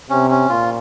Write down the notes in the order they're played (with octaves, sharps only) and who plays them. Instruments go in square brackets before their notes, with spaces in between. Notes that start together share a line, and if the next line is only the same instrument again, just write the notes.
[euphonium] C3 [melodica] C#4
[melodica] C#4
[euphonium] A#2 [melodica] F4